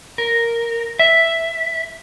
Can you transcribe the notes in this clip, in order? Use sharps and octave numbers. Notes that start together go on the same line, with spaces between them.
A#4
E5